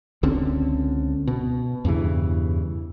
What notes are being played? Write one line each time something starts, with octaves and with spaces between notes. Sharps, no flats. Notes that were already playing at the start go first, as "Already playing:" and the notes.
C#2 D3 C4 C#4
B2
E2 G2 C#3 E3